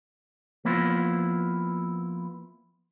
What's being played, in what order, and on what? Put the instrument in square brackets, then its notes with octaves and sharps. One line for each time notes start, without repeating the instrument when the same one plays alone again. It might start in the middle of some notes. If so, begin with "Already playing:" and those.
[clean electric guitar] F3 A#3 B3 E4 F4 B4